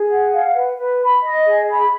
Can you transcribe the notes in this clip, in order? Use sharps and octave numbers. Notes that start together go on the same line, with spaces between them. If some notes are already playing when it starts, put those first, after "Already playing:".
Already playing: G#4
F#5
F5
B4
B4
B5
D#5
G#4
B5